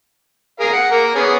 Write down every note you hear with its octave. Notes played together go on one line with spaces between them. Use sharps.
G#4 A#4 F5
F#5
A#3 A#4
B3 C#4 G#4